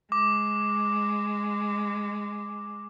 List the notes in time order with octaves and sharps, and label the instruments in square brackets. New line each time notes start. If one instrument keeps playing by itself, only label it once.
[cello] G#3 [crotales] D6